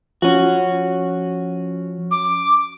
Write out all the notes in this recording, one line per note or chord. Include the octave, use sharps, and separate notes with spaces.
F3 C#4 F#4
D6